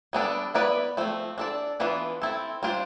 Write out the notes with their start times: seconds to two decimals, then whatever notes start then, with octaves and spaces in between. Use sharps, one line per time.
0.13 G3 B3 D4 A4
0.54 B3 E4 B4 D5
0.97 F3 A3 C4
1.38 D4 A4 D5
1.80 E3 B3 D4 F4 B4
2.22 C4 E4 A4
2.63 G3 D4 F4 C5